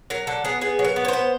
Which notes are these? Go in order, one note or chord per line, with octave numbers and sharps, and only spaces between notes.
F#3 A#4
D3 A4
B3 G#4
B3 G#4
F#3
A#4
B3
C#5
C5
B3